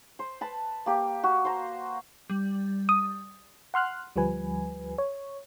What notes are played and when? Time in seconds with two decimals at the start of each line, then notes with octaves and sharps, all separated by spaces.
0.19 C5
0.41 B4 A5
0.86 A#3 G4
1.23 F#4
1.45 C5 A#5
2.30 G3
2.89 D#6
3.74 F#5 C6 F6 F#6
4.16 D2 F3 G3 B4 G#5
4.98 C#5